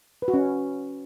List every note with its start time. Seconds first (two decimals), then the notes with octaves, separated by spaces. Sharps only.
0.22 B4
0.28 F#4
0.34 C#4